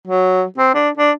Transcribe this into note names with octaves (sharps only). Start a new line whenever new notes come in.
F#3
C4
D4
D4